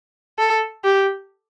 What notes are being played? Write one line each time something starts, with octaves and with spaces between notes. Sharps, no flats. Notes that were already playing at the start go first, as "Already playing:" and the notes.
A4
G4